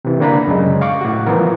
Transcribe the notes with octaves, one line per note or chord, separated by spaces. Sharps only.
C3 E3
D3 A#3 D4 A#5 B5
F#2 C#3 G#3
F5 C#6 D6
A2 F#4
E3 F3 B3 A#4